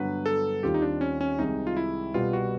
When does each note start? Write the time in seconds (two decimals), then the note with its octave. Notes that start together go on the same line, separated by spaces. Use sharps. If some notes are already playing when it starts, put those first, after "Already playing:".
Already playing: G2 D3 F#3 B3 B4
0.26 A4
0.63 D#2 D#3 G3 C4 F4 G4
0.74 D#4
0.82 D4
1.01 C#4
1.21 C#4
1.39 C2 C3 D#3 G#3 D#4
1.67 F4
1.77 E4
2.14 C2 B2 G3 B3 F4
2.33 F#4